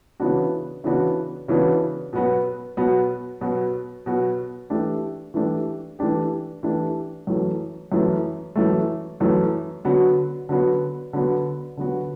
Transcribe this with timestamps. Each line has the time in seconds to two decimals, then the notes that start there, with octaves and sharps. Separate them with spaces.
0.20 C#3 E3 B3 D4 F#4
0.84 C#3 E3 B3 D4 F#4
1.48 C#3 E3 B3 D4 F#4
2.13 B2 F#3 B3 F#4
2.77 B2 F#3 B3 F#4
3.41 B2 F#3 B3 F#4
4.06 B2 F#3 B3 F#4
4.70 E3 A3 D4 G4
5.34 E3 A3 D4 G4
5.99 E3 A3 D4 G4
6.63 E3 A3 D4 G4
7.27 F#2 E3 A3
7.92 F#2 E3 A3
8.56 F#2 E3 A3
9.20 F#2 E3 A3
9.85 D3 F#3 B3 F#4
10.49 D3 F#3 B3 F#4
11.13 D3 F#3 B3 F#4
11.77 D3 F#3 B3 F#4